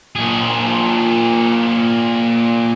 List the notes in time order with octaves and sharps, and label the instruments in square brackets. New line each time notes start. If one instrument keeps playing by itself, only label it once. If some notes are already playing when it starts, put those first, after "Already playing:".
[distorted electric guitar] A#2 G#4